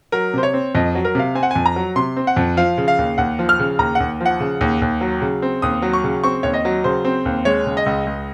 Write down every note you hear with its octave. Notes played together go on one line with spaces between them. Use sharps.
F#3 A#4
C3 C5
C#5
C4
F2 D#5
F#3
A#4
C3 F5
C4 G#5
F#5
F2 G#5
A#5
F#3
C3 C6
C4
F#5
F2
F3 F5
C#3
F5
D#2
D#2 F#5
F3
F6
C#3
D#2 A#5
D#2 F#5
F3
F#5
C#3
D#2
D#2
F#3
C#3
C4
D#2 D#6
F#3
C#6
C#3
C4 C#6
D#2 C#5
D#5
F#3
C#3 C5
C4
D#2
G#3 C#5
C#3
D#5
C#2
C#2